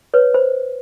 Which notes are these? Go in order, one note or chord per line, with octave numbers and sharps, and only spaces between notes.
B4 C#5
C5